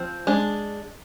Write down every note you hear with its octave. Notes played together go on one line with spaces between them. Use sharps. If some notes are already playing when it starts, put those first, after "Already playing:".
Already playing: F3 C4
G#3 D4